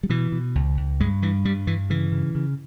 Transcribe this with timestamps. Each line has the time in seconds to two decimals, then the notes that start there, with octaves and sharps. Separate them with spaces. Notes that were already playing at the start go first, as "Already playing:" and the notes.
0.03 G3
0.10 B2 E3
0.32 B2
0.55 C#2
0.77 C#2
1.00 G2 G#3
1.22 G2 E3
1.45 G2 G3
1.67 G2 E3
1.90 C#3 E3
2.12 C#3
2.35 C#3